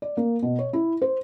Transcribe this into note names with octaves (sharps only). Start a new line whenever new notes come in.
D5
A#3
B2
C#5
E4
C5